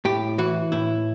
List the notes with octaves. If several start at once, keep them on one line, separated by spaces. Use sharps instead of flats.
A2 G4
E3 F#4
A2 E4